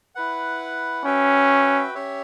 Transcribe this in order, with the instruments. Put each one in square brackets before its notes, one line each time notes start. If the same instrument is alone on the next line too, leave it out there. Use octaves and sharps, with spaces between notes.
[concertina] E4 B4 F#5
[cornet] C#4 [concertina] F#4 B4 E5 G5
[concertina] C#4 G4 C#5 E5